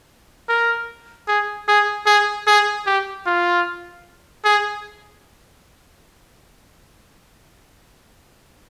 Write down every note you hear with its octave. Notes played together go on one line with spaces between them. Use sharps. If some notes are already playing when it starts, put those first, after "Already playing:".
A#4
G#4
G#4
G#4
G#4
G4
F4
G#4